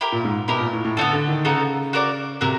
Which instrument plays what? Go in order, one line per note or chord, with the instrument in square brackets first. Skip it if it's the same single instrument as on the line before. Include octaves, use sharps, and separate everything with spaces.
[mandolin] E4 G4 A#4
[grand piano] A#2
G#2
[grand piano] B2 [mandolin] E4 G4 A#4
[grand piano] A#2
A2
A2
[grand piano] D3 [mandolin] B3 D#4 F#4 A4
[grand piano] D3
D#3
[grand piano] C#3 [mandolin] B3 D#4 F#4 A4
[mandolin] F#4 A#4 D5
[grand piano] C3 [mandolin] F#4 A#4